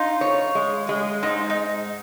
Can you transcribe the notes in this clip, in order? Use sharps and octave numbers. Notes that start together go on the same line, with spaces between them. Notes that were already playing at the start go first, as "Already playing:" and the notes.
Already playing: D#4 F4
C#5
G#3
G#3
G#2 D#4
D#4